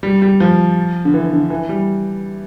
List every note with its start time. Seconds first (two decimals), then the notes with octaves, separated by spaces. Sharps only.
0.03 G3
0.22 G3
0.40 F3
1.05 D3
1.14 E3
1.33 D3
1.50 E3
1.69 G3